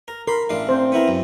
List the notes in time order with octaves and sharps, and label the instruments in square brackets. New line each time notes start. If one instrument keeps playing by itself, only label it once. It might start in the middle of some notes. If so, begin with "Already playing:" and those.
[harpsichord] A#4
[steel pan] A#4 [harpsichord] B5 C6
[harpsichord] A1 D4 F5
[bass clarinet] C4 [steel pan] C5
[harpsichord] B3 E4 A#4
F#2